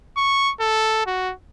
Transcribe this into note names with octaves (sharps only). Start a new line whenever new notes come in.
C#6
A4
F#4